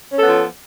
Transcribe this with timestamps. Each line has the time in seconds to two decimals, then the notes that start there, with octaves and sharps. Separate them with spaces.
0.12 C#4
0.16 A4
0.21 B3
0.25 F3